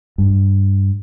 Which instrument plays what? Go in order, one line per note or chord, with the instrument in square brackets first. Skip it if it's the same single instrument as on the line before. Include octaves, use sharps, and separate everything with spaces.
[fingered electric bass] G2